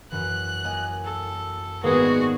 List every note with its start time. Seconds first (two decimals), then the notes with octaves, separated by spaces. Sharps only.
0.12 F#2 E3 F#6
0.65 A#3 D#5 G#5
1.05 A4
1.84 G#1 G3 G#3 A#3 B3 F#4 G#4